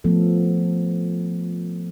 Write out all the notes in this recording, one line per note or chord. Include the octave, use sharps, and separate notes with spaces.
F3 A3 B3 A4